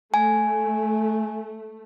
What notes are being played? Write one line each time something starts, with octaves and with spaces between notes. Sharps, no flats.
A3 G#5